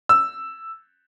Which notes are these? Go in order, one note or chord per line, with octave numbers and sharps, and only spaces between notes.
E6